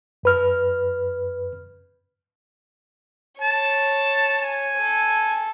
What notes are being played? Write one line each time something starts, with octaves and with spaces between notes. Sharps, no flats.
F#2 B4 F6
C#5 A5
G#5
A4